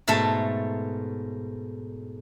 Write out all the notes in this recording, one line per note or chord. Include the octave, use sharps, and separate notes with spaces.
G#2 B2 A3 A4 A5